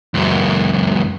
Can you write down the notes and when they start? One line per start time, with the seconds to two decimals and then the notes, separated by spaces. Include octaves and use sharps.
0.14 C#2 F#2